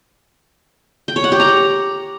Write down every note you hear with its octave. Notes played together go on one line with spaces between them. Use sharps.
G5
C#5
F#5
G4
A#5